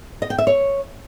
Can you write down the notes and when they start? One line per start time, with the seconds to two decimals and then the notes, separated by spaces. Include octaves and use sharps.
0.22 D#5
0.30 G5
0.38 E5
0.47 C#5